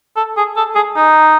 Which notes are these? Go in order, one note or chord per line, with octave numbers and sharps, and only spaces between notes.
A4
G#4
A4
G#4
D#4